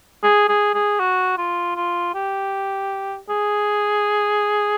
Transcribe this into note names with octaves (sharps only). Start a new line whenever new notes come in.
G#4
G#4
G#4
F#4
F4
F4
G4
G#4